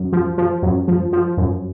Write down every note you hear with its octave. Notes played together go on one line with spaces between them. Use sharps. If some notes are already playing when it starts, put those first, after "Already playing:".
Already playing: F#2
F3
F3
F#2
F3
F3
F#2